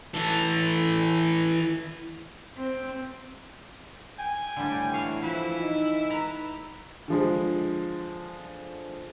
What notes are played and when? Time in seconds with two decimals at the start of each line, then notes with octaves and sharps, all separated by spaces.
0.14 E3 A4
2.57 C4
4.19 G5 G#5
4.57 A2 D3 G3
4.93 E3 F#4 F5
5.22 F3 E4 B4
5.60 D#4
6.10 B4 A#5
7.08 D3 F3 G#3